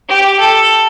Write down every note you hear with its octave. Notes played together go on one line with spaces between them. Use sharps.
G4
A4